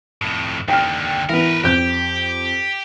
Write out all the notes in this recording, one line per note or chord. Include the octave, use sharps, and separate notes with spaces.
F2 A2
D#2 D3 G5 F6
E3 B3 A#4 B4
F2 G4 G6